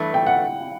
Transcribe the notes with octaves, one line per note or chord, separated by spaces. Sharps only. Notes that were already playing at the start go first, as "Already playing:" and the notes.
Already playing: G2 E3 A3
G5
F#5